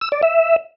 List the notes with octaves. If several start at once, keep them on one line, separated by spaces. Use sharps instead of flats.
E6
D5
E5